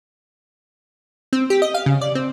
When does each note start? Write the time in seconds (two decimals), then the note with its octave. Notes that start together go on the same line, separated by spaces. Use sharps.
1.33 C4
1.50 G4
1.62 D#5
1.74 F5
1.86 C#3
2.01 D5
2.15 C4